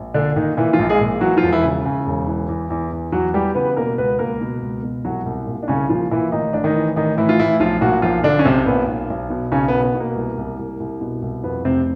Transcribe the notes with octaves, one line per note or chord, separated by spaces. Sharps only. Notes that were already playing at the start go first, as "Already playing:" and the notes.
Already playing: A#1
A#2 D3 D4
A#2 D#3 D#4
A#2 E3 E4
F3 F4
A#1
G#3 G#4
A#2
E3 F#3 F#4
F3 F4
E1
E3 E4
C#3
C#3
E1
E3
E2
E2
E2
E2 F#3 F#4
E3 G3 G4
C#3 B3 B4
B2 A#3 A#4
C#2 B3 B4
C#2 A#3 A#4
B2
C#2
B2
C2 F#3 F#4
C2
A#2
D4
C2 C#3 C#4
A#2 F3 F4
A#2 E3 E4
A1 D#3 D#4
A1 D4
D#3 D#4
E3
A1 D#3 D#4
A2 E3 E4
F4
A2 E3 E4
B1 F3 F4
A#2 F#3 F#4
B1 F3 F4
B1 D3 D4
C#4
B1 C3 C4
A#2 B3
B1
B1
B2
B1 C#3 C#4
B2 B3
B3
B2
A#3
C2
C2
C2
C2
B2
C2
F2 B3
F1 C3 C4